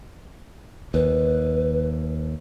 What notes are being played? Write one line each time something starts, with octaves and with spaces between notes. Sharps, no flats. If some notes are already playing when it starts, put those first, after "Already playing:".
D#2 B4